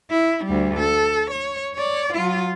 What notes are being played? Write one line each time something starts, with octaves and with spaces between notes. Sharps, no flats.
E4
D2 G3
A4
C#5
C#5 D5
F#3 F4